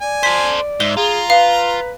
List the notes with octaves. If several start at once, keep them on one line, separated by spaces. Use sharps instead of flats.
D5 G#5
A4 C5 B6
G#2 E5 G7
F4 G#4 A#5
B4 F5